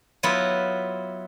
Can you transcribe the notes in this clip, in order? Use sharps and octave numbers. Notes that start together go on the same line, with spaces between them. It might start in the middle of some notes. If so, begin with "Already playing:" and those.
F#3 B3 E4 F4